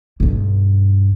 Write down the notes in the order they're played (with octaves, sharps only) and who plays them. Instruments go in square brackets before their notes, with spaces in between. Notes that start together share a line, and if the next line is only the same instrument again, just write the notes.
[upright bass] B1 G2